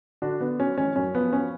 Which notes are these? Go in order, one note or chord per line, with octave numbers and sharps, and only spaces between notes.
D3 D4 F#4
D3 B3
F#3 C#4
A1 C#4
F#2 C#4
F3 B3
C#4